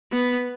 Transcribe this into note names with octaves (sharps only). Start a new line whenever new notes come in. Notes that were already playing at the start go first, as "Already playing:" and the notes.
B3